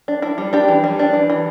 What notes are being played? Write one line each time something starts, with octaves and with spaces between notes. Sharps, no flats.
D4
D4 E4
G3
D4 G4
E3
G3
D4
E3
E3